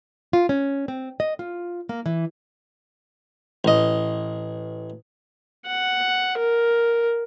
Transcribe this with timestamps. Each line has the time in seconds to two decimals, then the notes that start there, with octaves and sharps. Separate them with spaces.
0.33 F4
0.49 C#4
0.88 C4
1.20 D#5
1.39 F4
1.89 A#3
2.06 E3
3.65 A1 D#5
5.66 F#5
6.38 A#4